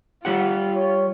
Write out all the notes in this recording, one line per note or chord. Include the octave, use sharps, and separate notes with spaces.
G3 F4 G4 F#5
C#5